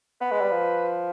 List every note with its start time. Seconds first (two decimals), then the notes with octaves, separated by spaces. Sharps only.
0.21 B3 B4
0.31 G#3
0.41 G3
0.51 F3